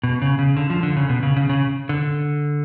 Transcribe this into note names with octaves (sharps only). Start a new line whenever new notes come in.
B2
C#3
C#3
D3
F3
D3
C#3
B2
C#3
C#3
C#3
D3